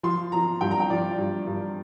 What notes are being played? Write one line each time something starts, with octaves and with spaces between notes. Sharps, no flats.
F3 C6
F3 A#5
G2 G5
A#5
G5
F3 D5
G2
G2